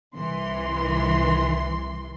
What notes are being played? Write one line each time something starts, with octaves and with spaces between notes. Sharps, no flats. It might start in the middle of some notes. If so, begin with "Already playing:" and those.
C2 E3 C6